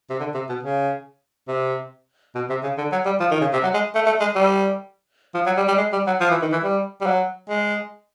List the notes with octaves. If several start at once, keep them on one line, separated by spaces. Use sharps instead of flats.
C3
D3
C3
B2
C#3
C3
B2
C3
C#3
D3
F#3
G3
F3
D#3
C#3
C3
F#3
G#3
A3
A3
G#3
G3
F3
F#3
G3
G3
G#3
G3
F#3
F3
E3
D#3
E3
G3
G3
F#3
G#3